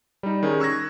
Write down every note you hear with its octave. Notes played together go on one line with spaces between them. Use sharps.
G3 D#4
D#3 C#4 G#4
C#6 E6 F#6 G#6 A#6